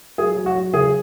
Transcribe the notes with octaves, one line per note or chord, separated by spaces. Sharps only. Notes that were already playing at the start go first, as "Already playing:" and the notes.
F#3 G#4
F#3
F#4
F#3
C#3 G#4